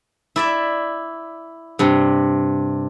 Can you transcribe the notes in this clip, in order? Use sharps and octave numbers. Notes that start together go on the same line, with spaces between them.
E4 D5 E5
G2 C3